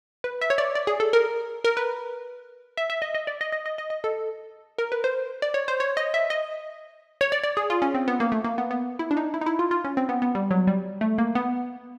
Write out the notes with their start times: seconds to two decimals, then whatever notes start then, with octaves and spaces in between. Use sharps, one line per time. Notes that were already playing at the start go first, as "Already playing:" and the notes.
0.24 B4
0.41 E5
0.50 C#5
0.58 D5
0.75 D5
0.87 G#4
1.00 A4
1.13 A#4
1.64 A#4
1.77 B4
2.77 E5
2.90 E5
3.02 D#5
3.15 D#5
3.27 D5
3.41 D#5
3.52 D#5
3.66 D#5
3.78 D#5
3.90 D#5
4.04 A4
4.78 A#4
4.92 B4
5.04 C5
5.42 D5
5.54 C#5
5.68 C5
5.80 C#5
5.97 D#5
6.14 E5
6.30 D#5
7.21 C#5
7.32 D5
7.43 D5
7.57 G#4
7.70 F4
7.82 C#4
7.94 C4
8.08 B3
8.20 A#3
8.32 A3
8.44 A#3
8.58 B3
8.71 B3
8.99 E4
9.11 D4
9.17 D#4
9.34 E4
9.41 D#4
9.46 E4
9.59 F4
9.71 F4
9.84 C#4
9.97 C4
10.09 B3
10.22 B3
10.35 G3
10.51 F#3
10.67 G3
11.01 A3
11.18 A#3
11.35 B3